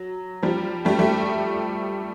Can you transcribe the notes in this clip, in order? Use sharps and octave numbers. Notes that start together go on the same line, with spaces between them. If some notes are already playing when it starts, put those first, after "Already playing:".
Already playing: F#3
F3 G3
G3 A3
G3 A3